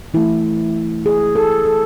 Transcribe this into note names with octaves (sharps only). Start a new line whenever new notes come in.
E3 A3 E4
G#4
A4
A4